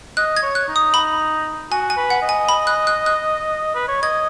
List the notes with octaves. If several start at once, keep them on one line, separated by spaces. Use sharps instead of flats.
D#5 F#6
G#6
C#5
F#6
D#4
D#6
B5
F#4 G#5
G#5
B4
F#5
D#5
G#5
B5
F#6
F#6
F#6
B4
C#5
D#5 G#6